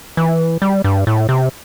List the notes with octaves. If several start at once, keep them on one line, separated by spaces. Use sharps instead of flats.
E3
G3
G2
A2
C3